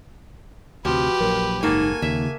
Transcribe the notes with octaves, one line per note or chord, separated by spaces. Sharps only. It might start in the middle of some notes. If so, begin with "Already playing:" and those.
D2 C3 F3 F#4 G4 B4
A#1 F#3 A#4
F#1 G#2 A#3 D#4 F#4 A4 G#5
D#2 C#3 E5